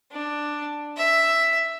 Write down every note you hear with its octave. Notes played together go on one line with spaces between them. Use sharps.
D4
E5